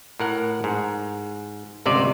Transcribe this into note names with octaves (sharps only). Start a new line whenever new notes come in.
A2 A#4 F#5
G#2
G1 C#2 C3 D5